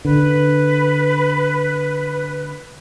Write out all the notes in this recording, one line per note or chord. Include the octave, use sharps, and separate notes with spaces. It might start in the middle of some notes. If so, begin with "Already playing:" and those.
D3 B4